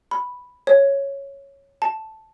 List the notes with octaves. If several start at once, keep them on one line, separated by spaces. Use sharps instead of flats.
B5
C#5
A5